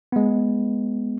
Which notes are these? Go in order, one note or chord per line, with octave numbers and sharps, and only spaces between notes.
G#3 B3